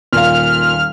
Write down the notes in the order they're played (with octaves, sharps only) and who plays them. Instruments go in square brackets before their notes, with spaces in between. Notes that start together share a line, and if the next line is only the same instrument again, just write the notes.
[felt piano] D#1 F5 [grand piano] A#2 [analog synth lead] F6